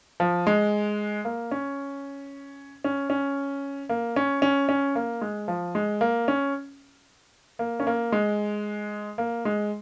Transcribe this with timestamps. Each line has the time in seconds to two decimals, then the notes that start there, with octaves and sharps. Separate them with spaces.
0.20 F3
0.47 G#3
1.25 A#3
1.51 C#4
2.84 C#4
3.10 C#4
3.89 A#3
4.16 C#4
4.42 C#4
4.69 C#4
4.95 A#3
5.21 G#3
5.48 F3
5.75 G#3
6.01 A#3
6.28 C#4
7.59 A#3
7.80 C#4
7.87 A#3
8.12 G#3
9.18 A#3
9.45 G#3